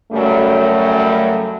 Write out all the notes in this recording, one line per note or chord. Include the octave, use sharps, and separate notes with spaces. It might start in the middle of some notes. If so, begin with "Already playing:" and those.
F#2 C#3 F#3 G3 A3